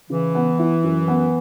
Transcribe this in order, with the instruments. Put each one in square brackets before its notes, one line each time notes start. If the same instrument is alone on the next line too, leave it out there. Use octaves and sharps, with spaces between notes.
[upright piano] C#3 [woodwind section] E3
[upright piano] B3
E4
F#2
B3